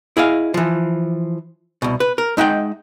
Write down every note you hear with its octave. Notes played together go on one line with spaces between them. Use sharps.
E4 G#4 D#5 F5
E3 F3
C2 B2
B4
A#4
G#3 D#4 E5 F#5 G5